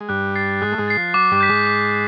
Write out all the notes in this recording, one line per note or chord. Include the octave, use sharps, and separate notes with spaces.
G#3
G2 G3 F#6
A6 C7
G#2 G#3 F#6
A3
G#2 G#3
A6 C7
F3
F#3 D6
G2 G3
G6 B6
G#2 G#3
D6
B6